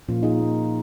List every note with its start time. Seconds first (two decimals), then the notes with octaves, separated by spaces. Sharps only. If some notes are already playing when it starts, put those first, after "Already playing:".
0.08 A#2 F3 A#3 C#4 F4
0.23 D#4 G#4
0.39 A#2 A#3